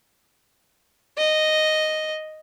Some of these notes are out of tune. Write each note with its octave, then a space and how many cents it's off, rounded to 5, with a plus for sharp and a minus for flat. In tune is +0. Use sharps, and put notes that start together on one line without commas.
D#5 -5